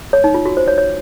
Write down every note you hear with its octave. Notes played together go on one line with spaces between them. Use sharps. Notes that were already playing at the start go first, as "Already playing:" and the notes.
C#5
D#4
F4
F#4
C5
C#5
C#5